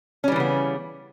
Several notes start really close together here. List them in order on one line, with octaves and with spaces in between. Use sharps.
C#4 G3 E3 C#3 B3